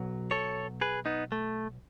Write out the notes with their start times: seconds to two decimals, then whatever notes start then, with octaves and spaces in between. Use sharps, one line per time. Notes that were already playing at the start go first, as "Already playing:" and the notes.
Already playing: B1 B2 F#3
0.31 A4 C#5
0.81 G#4 B4
1.06 B3 D#4
1.32 A3